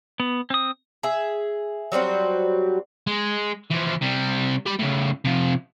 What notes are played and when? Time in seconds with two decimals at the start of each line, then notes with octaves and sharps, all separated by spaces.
0.20 B3
0.50 C4 D#6
1.03 G#4 E5
1.92 F#3 G3 C4 F#4
3.07 G#3
3.70 E3 F3
4.01 C3 G3
4.66 G4 B5
4.79 A2 C#3
5.25 C3 F3